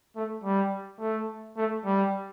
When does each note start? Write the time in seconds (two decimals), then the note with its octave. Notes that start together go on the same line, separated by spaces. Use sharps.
0.16 A3
0.44 G3
1.00 A3
1.57 A3
1.85 G3